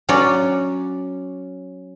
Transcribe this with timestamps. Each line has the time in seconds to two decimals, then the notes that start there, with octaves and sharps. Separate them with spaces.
0.09 F#3 C#4 D5